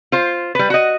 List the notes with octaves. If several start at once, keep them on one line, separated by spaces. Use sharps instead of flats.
F4 C5
G3 B4
F#4 D#5